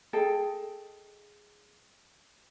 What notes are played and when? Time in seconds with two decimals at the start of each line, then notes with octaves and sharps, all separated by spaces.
0.13 G#4 A4 D#5 G5